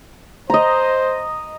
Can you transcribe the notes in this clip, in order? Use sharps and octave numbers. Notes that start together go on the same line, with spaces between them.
C5 D#5 A#5